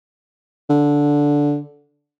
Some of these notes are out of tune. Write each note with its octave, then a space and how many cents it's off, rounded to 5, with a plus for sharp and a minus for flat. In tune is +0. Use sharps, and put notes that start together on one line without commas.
D3 -10